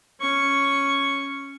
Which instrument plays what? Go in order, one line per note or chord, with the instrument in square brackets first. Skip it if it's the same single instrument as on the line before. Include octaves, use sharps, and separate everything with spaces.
[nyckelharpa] C#4 C#6